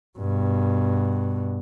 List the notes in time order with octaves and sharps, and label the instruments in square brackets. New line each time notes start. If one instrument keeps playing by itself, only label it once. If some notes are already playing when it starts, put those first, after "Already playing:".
[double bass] G2 B2